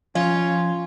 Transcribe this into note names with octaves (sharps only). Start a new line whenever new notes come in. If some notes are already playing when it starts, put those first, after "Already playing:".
F3 C#4 F4